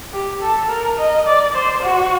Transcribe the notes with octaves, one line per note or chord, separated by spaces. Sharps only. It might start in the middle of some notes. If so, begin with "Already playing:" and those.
G4
A4
A#4
D#5
D5
C5
F#4